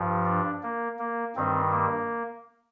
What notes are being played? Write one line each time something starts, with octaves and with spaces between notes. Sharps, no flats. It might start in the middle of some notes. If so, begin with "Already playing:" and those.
Already playing: G2 F3
D4
A#3
A#3
G2 D#3 G3 C4
A#3